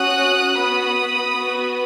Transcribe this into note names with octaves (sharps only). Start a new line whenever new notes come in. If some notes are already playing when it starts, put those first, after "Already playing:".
Already playing: C#4 F#4 D#6 F#6
B3 F#4 B5 D#6
B3 F#4